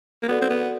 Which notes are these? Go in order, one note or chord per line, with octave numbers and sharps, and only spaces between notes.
A#3
B3 F#4 A4 D5 F#5
C4
B3